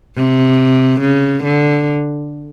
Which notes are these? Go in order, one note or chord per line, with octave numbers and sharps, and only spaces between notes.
C3
C#3
D3